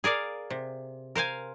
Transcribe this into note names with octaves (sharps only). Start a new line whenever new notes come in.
G#4 A#4 D5 F5
C3
A#4 C5 F5 G#5